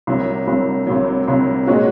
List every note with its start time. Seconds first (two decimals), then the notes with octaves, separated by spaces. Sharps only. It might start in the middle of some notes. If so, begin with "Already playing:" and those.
0.07 C2 C3 F#3
0.47 C2 C3 F#3
0.87 C2 C3 F#3
1.28 C2 C3 F#3
1.67 A#2 G#3 C#4 F#4